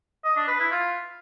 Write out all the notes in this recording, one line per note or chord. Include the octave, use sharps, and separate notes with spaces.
D#5
D4
B4
E4
F4